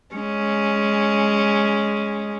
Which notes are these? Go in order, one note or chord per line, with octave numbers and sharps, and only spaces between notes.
G#3 C#4